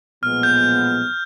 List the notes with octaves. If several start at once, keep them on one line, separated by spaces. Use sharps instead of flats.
B1 A#2 F3 G#3 B3 F6
G6